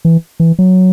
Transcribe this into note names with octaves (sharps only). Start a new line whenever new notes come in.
E3
E3
F#3